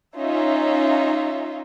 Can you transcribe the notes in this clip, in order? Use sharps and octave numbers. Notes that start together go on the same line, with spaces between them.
C#4 D#4 F4 E5